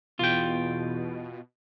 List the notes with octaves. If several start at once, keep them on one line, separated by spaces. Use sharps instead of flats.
E2 B2 F4 G5